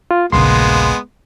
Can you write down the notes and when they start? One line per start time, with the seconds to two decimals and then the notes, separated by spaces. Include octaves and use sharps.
0.11 F4
0.32 D#1 A#1 C#3 G#3 A#3 B3 C6